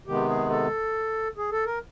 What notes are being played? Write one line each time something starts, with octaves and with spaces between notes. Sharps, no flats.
C3 D#3 G#3 B3 G4
G#4
A4
G#4
A4
A#4